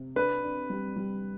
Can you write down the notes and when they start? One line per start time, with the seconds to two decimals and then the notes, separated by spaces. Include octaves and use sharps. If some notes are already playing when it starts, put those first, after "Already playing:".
Already playing: C3
0.16 D4 B4
0.44 D4
0.70 G3
0.96 G3